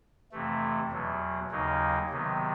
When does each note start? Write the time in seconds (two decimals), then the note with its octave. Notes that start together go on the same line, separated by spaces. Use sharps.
0.32 F2 C3 E3 A3
0.92 E2 B2 F#3
1.51 D#2 C#3 F#3 A#3 D#4
2.10 C3 D#3 F#3 B3